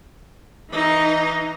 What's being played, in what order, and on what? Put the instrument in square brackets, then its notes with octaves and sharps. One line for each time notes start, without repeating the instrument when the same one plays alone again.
[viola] E3 D#4